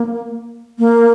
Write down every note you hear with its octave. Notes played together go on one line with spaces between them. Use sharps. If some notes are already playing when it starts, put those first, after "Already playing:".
Already playing: A#3
A#3